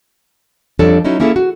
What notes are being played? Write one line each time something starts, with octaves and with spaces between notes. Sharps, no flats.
F2 F3 G3 D4 A4 C#5
F#3 C#4 D#4 E4
A#3 C#4 E4 G#4 A4
F#4